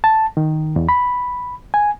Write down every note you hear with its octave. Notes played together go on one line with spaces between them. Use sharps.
A5
D#3
E2
B5
G#5